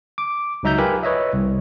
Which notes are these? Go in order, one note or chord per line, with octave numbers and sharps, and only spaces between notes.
D6
C#2 F#3 D#4 E5 A#5 G6
F4 G4 A#4 B4 G#5 B5
B4 C#5 D#5 E5
C2